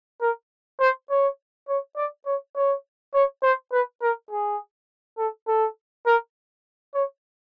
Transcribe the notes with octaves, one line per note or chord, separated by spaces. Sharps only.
A#4
C5
C#5
C#5
D5
C#5
C#5
C#5
C5
B4
A#4
G#4
A4
A4
A#4
C#5